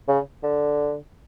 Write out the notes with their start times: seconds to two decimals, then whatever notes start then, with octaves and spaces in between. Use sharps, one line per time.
0.08 C#3
0.43 D3